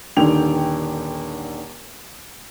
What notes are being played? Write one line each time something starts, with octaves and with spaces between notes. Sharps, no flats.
D#1 D3 D#3 G5 F7